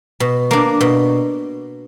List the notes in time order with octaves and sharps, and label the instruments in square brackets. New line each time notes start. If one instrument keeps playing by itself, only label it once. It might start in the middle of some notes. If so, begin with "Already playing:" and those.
[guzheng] B2
A#3 D4
B2